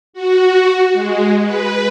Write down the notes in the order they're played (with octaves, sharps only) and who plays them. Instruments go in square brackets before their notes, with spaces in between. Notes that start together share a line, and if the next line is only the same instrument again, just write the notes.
[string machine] F#4
G#3
B4